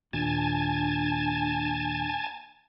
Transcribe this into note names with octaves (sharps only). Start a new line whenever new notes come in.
D#2 A#2 D4 G#5 A5